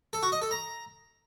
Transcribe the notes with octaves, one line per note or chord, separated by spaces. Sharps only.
A4
F#4
D#5
A4
A#5